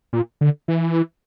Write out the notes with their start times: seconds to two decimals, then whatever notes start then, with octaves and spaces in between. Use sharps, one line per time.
0.13 A#2
0.41 D3
0.68 E3